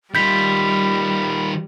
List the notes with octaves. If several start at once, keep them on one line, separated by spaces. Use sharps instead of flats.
D#3 G3 F4 B5 G6 B6